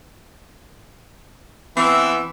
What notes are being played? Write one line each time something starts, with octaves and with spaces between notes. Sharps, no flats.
E3 B3 C4 E5